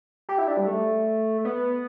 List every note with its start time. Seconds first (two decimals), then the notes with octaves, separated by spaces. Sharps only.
0.29 G4
0.38 E4
0.48 D4
0.57 G3
0.67 A3
1.45 B3